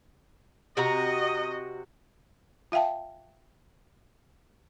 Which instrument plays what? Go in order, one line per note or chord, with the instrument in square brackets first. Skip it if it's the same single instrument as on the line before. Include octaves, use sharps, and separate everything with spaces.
[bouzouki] C3 F#4 A#5 [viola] D#5
[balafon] F4 E5 F5 G5 A5